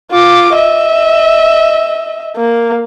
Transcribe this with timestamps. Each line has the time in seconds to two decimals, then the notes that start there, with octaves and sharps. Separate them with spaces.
0.11 F4 D6
0.55 D#5 E5
2.36 A#3